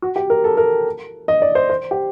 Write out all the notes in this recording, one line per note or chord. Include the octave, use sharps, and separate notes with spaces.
F#4
G4
A#4
A4
A#4
D#5
D5
C5
C5
G4